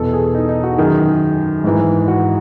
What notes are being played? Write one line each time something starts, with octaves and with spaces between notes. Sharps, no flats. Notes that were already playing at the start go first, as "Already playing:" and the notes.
Already playing: E2 B2 A4
G#4
D#4
D#4
F#4
F#2 D#3 G#4
G#2 E3
F#4